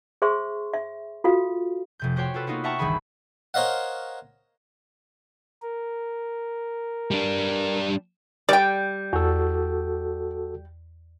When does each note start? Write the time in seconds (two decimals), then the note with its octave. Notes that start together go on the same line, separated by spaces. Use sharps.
0.22 G#4 C5 E5 C6 C#6
0.74 E5
1.24 F4 F#4 A4 F5
1.99 F1 C3 G6
2.16 F#4 G4 C5 C#5 G5
2.34 F4 F#4 A4 B4
2.47 A#3 B3 D#4 F4 F#4
2.64 E5 F#5 G5 A5 A#5 C#6
2.79 G1 C2 D#3 E3 G#4 B5
3.54 A#4 C5 C#5 D#5 F5 F#5
5.62 A#4
7.11 G3 D4
8.49 G3 D5 G5
9.13 E2 F#4 A4